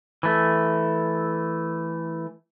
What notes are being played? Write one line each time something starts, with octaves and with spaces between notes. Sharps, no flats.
E3 A3